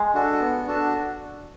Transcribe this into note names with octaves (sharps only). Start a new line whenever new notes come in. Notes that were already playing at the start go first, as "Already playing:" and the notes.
Already playing: G#3
D4 F#4 A4
B3
D4 F#4 A4